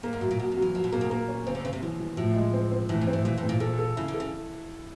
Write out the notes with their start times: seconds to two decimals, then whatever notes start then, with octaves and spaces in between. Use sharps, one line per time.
0.03 A#2 A#3
0.13 G#2
0.21 A2 F#3
0.31 A#2
0.39 B2 F#3
0.52 C3
0.57 F#3
0.62 E3
0.75 F3 F#3
0.84 B2
0.92 A#2 A#3
1.01 B2
1.10 A#2 A#3
1.28 C#4
1.47 C#3 C4
1.55 D3
1.64 C#3 C4
1.73 C3
1.82 B2 E3
2.00 E3
2.17 A2 F3
2.36 G#3
2.53 C4
2.72 C4
2.89 A2 E3
3.01 G#2
3.07 C4
3.13 A2
3.25 A#2 E3
3.38 A2
3.43 C4
3.49 A#2
3.60 A#2 A4
3.79 A4
3.97 C#3 E4
4.08 D3
4.14 A4
4.20 C#3